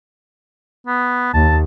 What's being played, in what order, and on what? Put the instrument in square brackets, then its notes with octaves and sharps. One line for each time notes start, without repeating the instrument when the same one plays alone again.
[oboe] B3
[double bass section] D#2 [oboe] A5